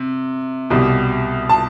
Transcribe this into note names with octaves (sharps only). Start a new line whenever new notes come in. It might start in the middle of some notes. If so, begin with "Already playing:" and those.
Already playing: C3
C2 B2 G3
A5